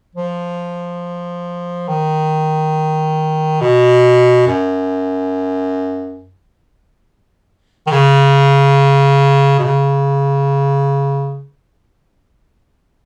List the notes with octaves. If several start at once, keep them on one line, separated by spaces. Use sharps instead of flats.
F3
D#3
B2
F#2
D#3
C#3
B2
C#3